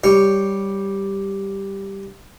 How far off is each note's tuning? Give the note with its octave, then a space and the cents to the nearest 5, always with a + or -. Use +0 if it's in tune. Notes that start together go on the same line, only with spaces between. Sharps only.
G3 +0 C#5 +0